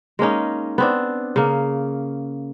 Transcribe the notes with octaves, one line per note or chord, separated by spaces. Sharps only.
G#3 A#3 C#4 D#4
B3 C4 D4
C#3 A#3